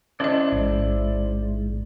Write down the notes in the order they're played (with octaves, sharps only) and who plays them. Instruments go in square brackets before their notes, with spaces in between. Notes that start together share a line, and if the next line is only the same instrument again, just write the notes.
[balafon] C#4 D#5 [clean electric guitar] E4 C5 D5
[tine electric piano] A1 [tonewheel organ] G#2